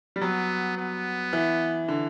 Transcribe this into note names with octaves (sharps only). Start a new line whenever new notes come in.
G3
F#3 B3
B3
E3
D3